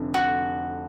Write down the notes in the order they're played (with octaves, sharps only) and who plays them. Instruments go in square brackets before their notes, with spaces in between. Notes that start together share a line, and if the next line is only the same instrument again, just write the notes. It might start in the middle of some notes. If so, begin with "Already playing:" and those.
Already playing: [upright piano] F1 F2 D3
[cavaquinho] F#4